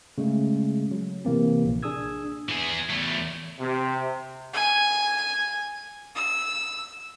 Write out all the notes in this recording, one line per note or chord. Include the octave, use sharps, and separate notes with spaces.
C#3 G#3 A3
F#3
C3 E3 A#3 C4
A#1
D4 G#4 D#6 E6 G#6
E3 G#4
E2 A3
C3
G#5
E6